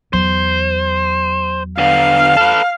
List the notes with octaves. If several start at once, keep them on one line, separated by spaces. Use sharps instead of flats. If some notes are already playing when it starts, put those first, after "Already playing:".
E2 F#3 C5
D3 B3 F5
A4 B4